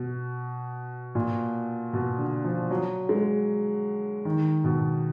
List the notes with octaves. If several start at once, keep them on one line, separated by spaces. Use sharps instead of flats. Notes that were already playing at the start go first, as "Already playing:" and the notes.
Already playing: B2
A#2
B2
D3
F3
F#3
G#3
D#3
B2